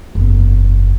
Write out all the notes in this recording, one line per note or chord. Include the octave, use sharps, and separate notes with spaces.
F#1 E2